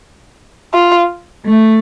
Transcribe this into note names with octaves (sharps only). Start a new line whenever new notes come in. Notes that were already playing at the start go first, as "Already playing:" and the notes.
F4
A3